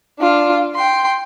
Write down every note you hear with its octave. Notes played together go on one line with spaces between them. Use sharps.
D4 F4
G5 C6